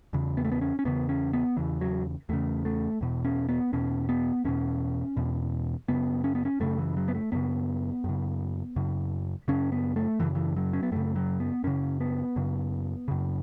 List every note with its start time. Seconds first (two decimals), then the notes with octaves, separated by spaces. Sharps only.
0.13 E2 C#3
0.37 B3
0.45 A3
0.52 B3
0.61 C#4
0.79 C#4
0.85 E2 C#3 B3
1.09 C#4
1.33 B3
1.57 E2 C#3 E3
1.81 F#3
2.29 E2 C#3 A3
2.65 A3
3.01 E2 B2
3.25 C#4
3.49 B3
3.73 E2 B2 C#4
4.09 B3
4.44 E2 B2 C#4
5.17 E2 B2
5.88 F#2 C#3 B3
6.24 C#4
6.35 B3
6.45 C#4
6.60 F#2 C#3 A3
6.79 E3
6.97 F#3
7.08 B3
7.14 A3
7.32 F#2 C#3 B3
8.04 F#2 C#3
8.76 F#2 C#3
9.48 F#2 C#3 C#4
9.72 B3
9.96 A3
10.20 F#2 C#3 E3
10.35 E3
10.56 F#3
10.73 C#4
10.83 B3
10.92 F#2 C#3 A3
11.16 F#3
11.40 B3
11.64 F#2 C#3 C#4
12.00 B3
12.36 F#2 C#3
13.08 F#2 C#3